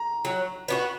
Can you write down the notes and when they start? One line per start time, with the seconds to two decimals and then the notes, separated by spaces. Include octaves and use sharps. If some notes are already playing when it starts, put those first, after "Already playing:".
Already playing: A#5
0.25 F#3
0.68 B3 D4 F#4